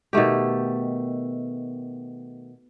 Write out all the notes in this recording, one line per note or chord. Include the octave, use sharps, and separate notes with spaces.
B2 D#3 A3 G4